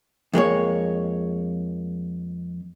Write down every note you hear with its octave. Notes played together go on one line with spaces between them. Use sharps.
F2 G#3 A#3 C#5